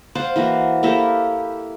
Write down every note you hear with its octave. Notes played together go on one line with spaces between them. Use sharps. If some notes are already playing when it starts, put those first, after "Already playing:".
C5 D5 F5 F#5
E3 A#3 F#4
A#3 E4 G4 A4